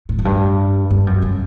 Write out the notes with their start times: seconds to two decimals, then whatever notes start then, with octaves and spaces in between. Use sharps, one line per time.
0.09 A2
0.19 F#2
0.25 G2
0.90 G2
1.07 F#2
1.22 C#3